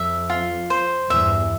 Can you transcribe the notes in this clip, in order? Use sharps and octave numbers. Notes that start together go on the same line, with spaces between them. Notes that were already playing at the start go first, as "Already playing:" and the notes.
Already playing: F2 E5
F4
C5
E2 G2 E5